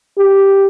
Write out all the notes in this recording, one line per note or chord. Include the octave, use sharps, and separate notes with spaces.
G4